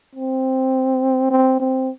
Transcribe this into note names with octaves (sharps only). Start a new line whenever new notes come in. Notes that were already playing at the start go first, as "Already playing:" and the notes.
C4
C4
C4